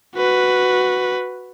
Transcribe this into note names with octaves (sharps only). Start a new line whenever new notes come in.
F#4 B4